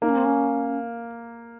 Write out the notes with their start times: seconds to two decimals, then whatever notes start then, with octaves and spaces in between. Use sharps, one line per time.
0.02 A#3 D#4
0.09 C#4
0.17 C4
0.25 C#4